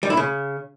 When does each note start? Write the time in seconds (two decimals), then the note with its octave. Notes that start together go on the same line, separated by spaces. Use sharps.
0.03 G3
0.10 E4
0.17 C#3